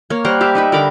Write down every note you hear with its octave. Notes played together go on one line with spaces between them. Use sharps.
A#3 C#5
G3 A#4 C5 F#5
G4 E5 F5
D#4 B4 E5
D3 A#4 B5 D6